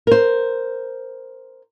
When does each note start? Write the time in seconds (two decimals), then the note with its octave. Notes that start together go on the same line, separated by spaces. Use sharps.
0.07 A#4 C5